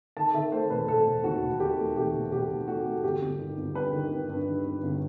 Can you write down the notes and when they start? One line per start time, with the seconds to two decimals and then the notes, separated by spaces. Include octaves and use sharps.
0.17 D#3 A5
0.34 D#3 E5
0.52 A3 C5
0.70 E1 B4
0.88 E1 A4
1.07 E1
1.24 D#2 F#4
1.42 E1
1.60 D#3 G4
1.78 A3
1.96 E1 G4
2.14 E1
2.32 E1 G4
2.50 E1
2.68 A3 F#4
2.85 A3
3.04 G1 G4
3.21 G1
3.39 D#3
3.57 G1
3.75 G2 B4
3.93 D#3
4.11 G2
4.29 G2
4.47 D#3
4.65 G2
4.83 G1